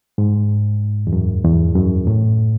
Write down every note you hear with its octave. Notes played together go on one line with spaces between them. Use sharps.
G#2
E2
F#2
E2
F#2
A2